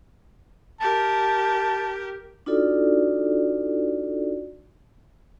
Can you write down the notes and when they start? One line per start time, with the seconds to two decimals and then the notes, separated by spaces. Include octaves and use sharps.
0.81 G4 A#4 A5
2.46 D4 D#4 F4 F#4 A4 D5